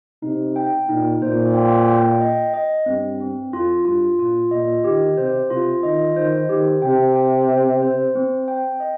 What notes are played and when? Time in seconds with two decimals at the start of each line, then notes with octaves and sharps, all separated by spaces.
0.22 C3 D#4
0.56 G5
0.89 A#2 D#4
1.22 A#2 C5
1.54 G5
1.88 G5
2.20 D#5
2.54 D#5
2.86 G2 C4
3.20 C4
3.53 F2 F4
3.85 G2 F4
4.19 A#2 F4
4.51 A#2 D#5
4.84 D#3 G4
5.17 C3 C5
5.50 C3 F4
5.83 D#3 D#5
6.16 D#3 C5
6.49 D#3 G4
6.82 C3 G5
7.16 G5
7.49 C5
7.82 C5
8.15 C4
8.48 G5
8.80 D#5